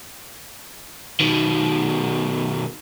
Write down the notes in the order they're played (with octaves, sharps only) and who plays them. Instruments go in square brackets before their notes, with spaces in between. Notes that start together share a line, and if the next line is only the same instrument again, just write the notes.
[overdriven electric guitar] B2 D#3